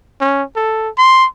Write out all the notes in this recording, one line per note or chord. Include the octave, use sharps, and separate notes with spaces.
C#4
A4
C6